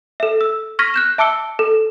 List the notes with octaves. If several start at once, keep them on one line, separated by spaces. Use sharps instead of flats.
A4 E5
E6
C#6 F6 G#6 A#6 B6 D#7
F#6 G6 E7
E5 A5 D6 E6 C#7 G7
A4